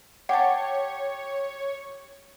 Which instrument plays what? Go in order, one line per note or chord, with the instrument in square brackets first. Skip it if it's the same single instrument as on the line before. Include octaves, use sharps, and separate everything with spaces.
[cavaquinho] G4 A5 [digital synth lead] C#5 [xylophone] F#5